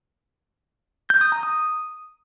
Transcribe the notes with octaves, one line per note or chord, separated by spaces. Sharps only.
G6
D#6
A#5
D#6